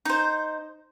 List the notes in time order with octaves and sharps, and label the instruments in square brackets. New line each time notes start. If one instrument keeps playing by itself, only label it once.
[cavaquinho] D#4 C5